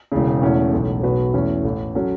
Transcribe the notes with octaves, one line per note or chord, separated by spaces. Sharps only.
E1 E2 C#3
E2 B2 A3 C#4
B1 A2 E3
B1 B2 B3 F#4 B4
E2 E3 A3 C#4
A1 A2 E3
F#3 C#4 F#4 A4